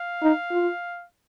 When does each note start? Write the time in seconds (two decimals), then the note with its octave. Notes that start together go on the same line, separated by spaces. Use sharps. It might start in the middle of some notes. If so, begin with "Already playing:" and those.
Already playing: F5
0.22 D#4
0.51 F4